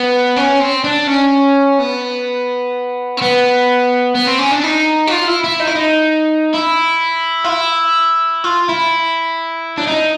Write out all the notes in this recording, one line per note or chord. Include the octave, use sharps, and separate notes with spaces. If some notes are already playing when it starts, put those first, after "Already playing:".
Already playing: B3
C#4
C4
D4
C#4
B3
C4
B3
B3
C4
C#4
D4
D#4
F#4
F4
E4
E4
D#4
E4
D#4
E4
F4
E4
F4
E4
D4
D#4